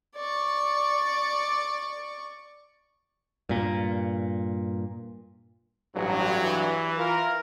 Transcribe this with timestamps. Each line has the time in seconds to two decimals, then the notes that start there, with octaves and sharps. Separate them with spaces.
0.15 D5 C#6
3.49 G2 A#2
5.96 A1 G2 F#3
6.41 E3
6.98 F4 A#4